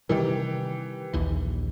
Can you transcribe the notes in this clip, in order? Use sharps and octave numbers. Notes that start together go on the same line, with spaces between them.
C3 D#3 E3 G3 G4 A#4
A#1 D#2 E3